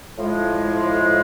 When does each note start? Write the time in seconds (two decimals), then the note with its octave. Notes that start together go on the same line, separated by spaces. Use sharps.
0.17 A2 F3 G#3